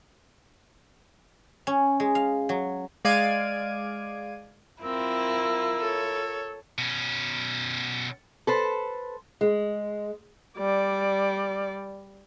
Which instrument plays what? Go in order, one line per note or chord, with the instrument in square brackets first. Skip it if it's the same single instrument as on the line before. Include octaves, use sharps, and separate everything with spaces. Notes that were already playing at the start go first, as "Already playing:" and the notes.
[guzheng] C#4
G#3
F5
F#3
[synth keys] G#3 D5 F5 G#6 D7 D#7
[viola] C4 [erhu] E4 [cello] F4 A#4 [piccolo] E6
[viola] A4 C#5
[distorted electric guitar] B2 C#4
[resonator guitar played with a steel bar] A4 B4 C5
[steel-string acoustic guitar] G#3
[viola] G3 D5